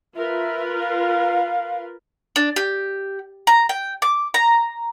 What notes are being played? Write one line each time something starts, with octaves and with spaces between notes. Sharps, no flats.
F4 A#4 B4 E5
F5
D4
G4
A#5
G5
D6
A#5